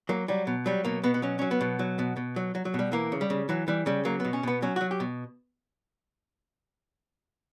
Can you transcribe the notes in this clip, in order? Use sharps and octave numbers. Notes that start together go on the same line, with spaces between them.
F#3 A#3
F#3 G3
B2
F#3 G3
B2 A#3
B2 B3
B3
F#3 C#4
F#3 C#4
B3
B2
F#3
B2
B2
F#3
F#3
F#3
B2
G3
E3 A#3
C#3
G3
C#3
E3 F#3
E3 G3
C#3 G3
F#3 A#3
B2 B3
C#4
B2 B3
F#3 C#4
F#3 F#4
G4
B2